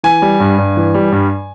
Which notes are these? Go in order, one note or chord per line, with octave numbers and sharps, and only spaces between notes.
E3 G#5
G3
G2
G2
E3
G3
G2